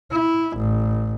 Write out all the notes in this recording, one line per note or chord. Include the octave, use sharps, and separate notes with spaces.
E4
A1